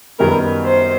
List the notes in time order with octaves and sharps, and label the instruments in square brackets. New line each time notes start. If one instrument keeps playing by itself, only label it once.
[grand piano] F#2 D#3 G3 B3 [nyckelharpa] A#4
[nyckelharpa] C5